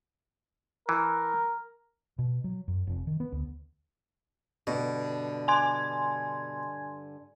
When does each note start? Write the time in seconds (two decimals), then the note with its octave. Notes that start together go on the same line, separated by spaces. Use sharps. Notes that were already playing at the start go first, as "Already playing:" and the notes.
0.89 E3 A#4
2.19 B2
2.44 F#3
2.68 F#2
2.87 F1
3.07 D#3
3.20 B3
3.32 D2
4.67 G2 B2 D3
5.48 G#5 C6 G#6